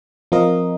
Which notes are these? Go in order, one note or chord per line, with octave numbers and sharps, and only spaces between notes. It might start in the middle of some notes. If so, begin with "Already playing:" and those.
F3 C4 F4 A#4 D#5